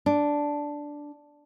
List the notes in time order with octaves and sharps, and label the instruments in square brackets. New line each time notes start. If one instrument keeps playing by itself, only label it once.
[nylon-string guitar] D4